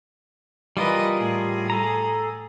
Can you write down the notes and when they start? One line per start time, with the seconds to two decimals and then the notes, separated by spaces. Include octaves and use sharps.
0.77 E3 G3 F4 A#4 B4 D#5
1.17 A2 G#4
1.70 A4 A#5